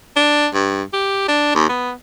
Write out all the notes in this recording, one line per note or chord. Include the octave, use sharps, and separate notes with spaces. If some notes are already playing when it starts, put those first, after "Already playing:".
D4
G2
G4
D4
D#2
B3